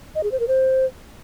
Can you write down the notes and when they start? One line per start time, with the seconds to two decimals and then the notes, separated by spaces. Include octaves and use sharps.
0.15 D#5
0.23 G#4
0.32 C5
0.40 A#4
0.48 C5